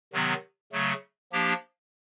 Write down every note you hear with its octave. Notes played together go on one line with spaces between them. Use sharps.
C3 D#3 F#3 B3
C#3 F#3 A3
F3 A#3 D4 G4